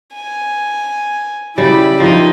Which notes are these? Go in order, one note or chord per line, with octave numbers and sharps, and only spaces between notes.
G#5
C#3 G3 E4 G4 D5 B5
F3 G3 A#3 D#4 D#5